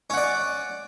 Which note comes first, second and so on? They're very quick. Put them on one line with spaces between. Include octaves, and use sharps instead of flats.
C#4 F#5 D5